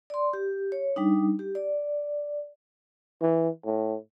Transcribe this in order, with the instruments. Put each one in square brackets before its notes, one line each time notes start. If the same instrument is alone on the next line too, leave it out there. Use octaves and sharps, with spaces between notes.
[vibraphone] D5 C6
G4
C#5
G3 D4 D#4
G4
D5
[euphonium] E3
A2